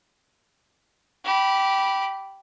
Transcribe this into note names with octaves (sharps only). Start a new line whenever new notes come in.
G4 B5